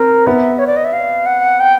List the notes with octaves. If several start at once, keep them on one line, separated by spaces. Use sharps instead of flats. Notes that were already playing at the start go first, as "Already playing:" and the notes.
Already playing: C4 A#4
B3 E5
C#5
D5
D#5
E5
F5
F#5
G5